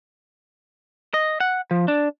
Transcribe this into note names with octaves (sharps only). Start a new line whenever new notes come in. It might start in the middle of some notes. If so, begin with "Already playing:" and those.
D#5
F#5
F3
D4